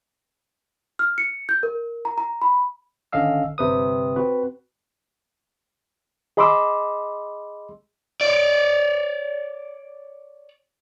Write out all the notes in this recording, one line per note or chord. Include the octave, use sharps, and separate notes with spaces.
F6
C#7
G6
A#4
A#5
A#5
B5
G#1 D3 C#4 D#5 F5 E6
G1 C3 B4 D#6
C4 F#4 B4
G#4 D#5 B5 C6 D6 E6
C#5 D5